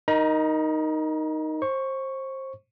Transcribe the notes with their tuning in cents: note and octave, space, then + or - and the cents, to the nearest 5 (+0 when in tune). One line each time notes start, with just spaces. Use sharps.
D#4 +0 A#4 +0 A#5 +40
C5 +25 C#6 +0